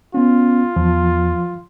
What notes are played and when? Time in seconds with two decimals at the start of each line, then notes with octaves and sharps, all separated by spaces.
0.14 B3 C#4 F4
0.76 E2 F3